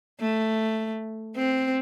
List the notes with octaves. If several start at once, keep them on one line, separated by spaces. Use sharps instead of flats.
A3
C4